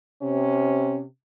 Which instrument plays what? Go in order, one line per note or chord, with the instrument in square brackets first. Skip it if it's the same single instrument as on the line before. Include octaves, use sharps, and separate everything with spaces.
[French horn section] C3 C#4